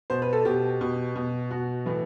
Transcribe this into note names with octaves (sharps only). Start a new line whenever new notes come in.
B2 C5
B4
A4
B2 G4
B2
B2
B2 F#4
A2 E3